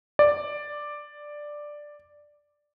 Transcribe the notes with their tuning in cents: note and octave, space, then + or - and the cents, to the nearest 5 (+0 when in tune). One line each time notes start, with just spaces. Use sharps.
D5 +5